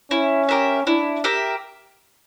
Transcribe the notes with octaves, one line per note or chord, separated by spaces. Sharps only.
C#4 E4
G4 A#4 E5
D4 E4
G4 A#4 E5